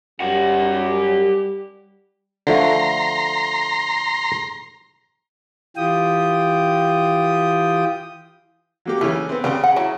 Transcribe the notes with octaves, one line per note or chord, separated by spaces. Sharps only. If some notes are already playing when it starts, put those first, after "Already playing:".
F#2 G3 G4 F#5
D3 F3 A3 A#5 C6
E3 F4 G4 G5 D#6
F#3 A#3 G4
C#3 E3 A3 C#4
B3 C4
C#3 G3 C4
F#5
F#3 E4